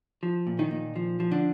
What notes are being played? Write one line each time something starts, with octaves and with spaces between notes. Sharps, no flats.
F3
A#2
D#3 D#4
A#2
F3
F3
D3 D4